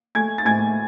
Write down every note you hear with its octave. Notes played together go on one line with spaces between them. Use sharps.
A3 G#5 G#6
A6
A2 G#5 G#6